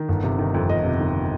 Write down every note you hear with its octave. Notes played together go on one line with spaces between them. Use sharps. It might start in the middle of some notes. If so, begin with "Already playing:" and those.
Already playing: D#3
G1
C3
D#3
F2
G1 D#5
C3
D#3